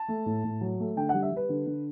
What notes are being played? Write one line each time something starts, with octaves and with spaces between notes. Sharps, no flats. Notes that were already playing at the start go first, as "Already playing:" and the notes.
Already playing: A5
A3
A2
A2
F#3
A3
D3 G5
F#5
G3
E5
G3 B4
D3
D3